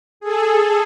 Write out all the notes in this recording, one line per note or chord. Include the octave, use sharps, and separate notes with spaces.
G#4 A4